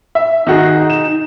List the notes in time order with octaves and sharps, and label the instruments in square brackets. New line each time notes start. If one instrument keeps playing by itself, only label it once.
[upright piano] E5
[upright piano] D#3 F#4 G#4 [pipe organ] D#4
[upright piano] E7